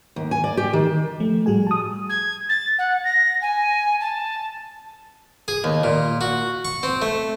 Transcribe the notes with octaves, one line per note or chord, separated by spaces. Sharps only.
D#2
G#5
D5
G4
D#3
F3 A3
A2 G3 F#4 G#4 G#5
A5 D#6
G#6
A6
F#5
A#6
G#5
A5
G#4
D#2
A#2
F#4
C#6
C4
A3